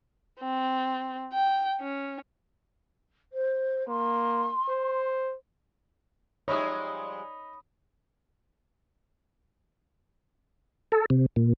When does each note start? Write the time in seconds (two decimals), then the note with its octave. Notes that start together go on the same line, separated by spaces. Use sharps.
0.40 C4
1.33 G5
1.81 C#4
3.32 C5
3.88 A#3 C6
4.69 C5
6.48 F3 G3 G#3 D#4 C#5 E5 B5 D#6
10.92 A4
11.10 C3
11.36 A#2